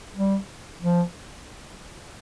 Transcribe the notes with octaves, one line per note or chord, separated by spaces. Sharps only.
G3
F3